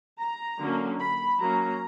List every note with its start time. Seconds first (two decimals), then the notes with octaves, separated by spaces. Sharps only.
0.19 A#5
0.59 D3 F#3 A#3 C#4
1.00 B5
1.40 F#3 A#3 C#4 A#5